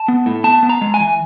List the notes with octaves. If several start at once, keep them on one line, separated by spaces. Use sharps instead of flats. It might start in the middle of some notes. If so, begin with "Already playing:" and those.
Already playing: A5
B3
A2
B3 A5
B3
A#5
G#3
G#5
E3